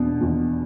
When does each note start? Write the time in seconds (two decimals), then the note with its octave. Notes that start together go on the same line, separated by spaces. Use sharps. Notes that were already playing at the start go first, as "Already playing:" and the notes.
Already playing: E2 B2 D4
0.21 E2 B2